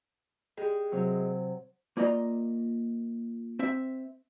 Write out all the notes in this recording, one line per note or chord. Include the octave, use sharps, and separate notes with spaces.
G#3 G4
C3 F#3
A#3 F4 D5 D#5 F#5 A#5
C4 E5